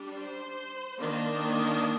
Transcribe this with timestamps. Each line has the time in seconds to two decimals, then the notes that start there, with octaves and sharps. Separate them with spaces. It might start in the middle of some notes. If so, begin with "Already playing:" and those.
Already playing: G3 D4
0.16 C5
0.98 D#3 A#3 D4